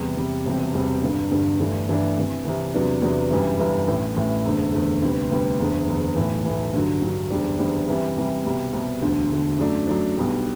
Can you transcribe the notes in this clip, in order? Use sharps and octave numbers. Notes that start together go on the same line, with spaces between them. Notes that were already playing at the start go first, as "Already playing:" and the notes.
Already playing: E2 C3 G3
E2 C3 G3
E1 E2 C3 G3 C4
E1 E2 C3 G3 C4
G1 G2 D3
G1 G2 D3
G1 G2 E3 A3 D4
G1 G2 E3 A3 D4
C2 C3 E3
C2 C3 E3
E2 C3 F#3 B3 D4
E2 C3 F#3 B3 D4
G1 F#2 E3 G3
G1 F#2 E3 G3
A1 A2 E3
A1 A2 E3
F#1 E2 D3 A3
F#1 E2 D3 A3
D2 C3 G3 B3
D2 C3 G3 B3
F#1 E2 D3
F#1 E2 D3
B1 A2 E3
B1 A2 E3
G2 D3 F#3
G2 D3 F#3
F#1 E2 D3 G3 D4
F#1 E2 D3 G3 D4
C2 C3 E3 G3
C2 C3 E3 G3
C2 B2 G3
C2 B2 G3
E1 D2 D3
E1 D2 D3
F#2 F#3 A3 D4
F#2 F#3 A3 D4
B1 B2 G3 D4